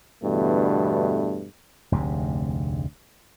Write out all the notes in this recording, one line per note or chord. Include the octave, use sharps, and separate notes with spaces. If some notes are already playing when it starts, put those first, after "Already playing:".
E2 G2 B2 D3 E3 A3
F1 D2 G#2 C3